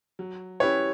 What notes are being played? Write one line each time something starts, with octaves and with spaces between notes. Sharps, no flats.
F#3
C#4 E4 G4 B4 C#5